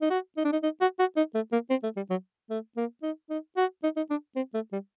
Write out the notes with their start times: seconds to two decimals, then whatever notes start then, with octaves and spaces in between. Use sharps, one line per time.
0.02 D#4
0.10 F#4
0.37 D#4
0.45 D4
0.53 D#4
0.63 D#4
0.81 F#4
1.00 F#4
1.17 D#4
1.35 A3
1.53 A#3
1.70 C4
1.84 A3
1.97 G3
2.10 F#3
2.50 A3
2.77 A#3
3.03 D#4
3.30 D#4
3.57 F#4
3.84 D#4
3.97 D#4
4.11 D4
4.36 C4
4.54 A3
4.73 G3